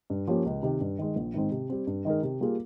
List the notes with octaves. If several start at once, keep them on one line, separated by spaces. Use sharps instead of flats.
G2
F3 A#3 C#4 G4
C#2
C3 D#3
G2
D#3 G#3
A#1
G#2 D#3 G#3 C4
C3
G3 C4
G2
D#3 G#3 D#4 A#4
C3
G3 A#3 F4 G#4